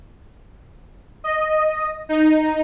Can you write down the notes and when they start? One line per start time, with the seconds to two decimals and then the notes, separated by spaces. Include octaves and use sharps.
1.24 D#5
2.09 D#4